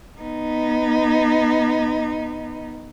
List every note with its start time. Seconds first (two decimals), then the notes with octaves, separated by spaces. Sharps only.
0.21 B3 D#4